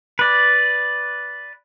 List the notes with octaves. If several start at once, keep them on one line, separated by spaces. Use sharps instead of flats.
B4 D5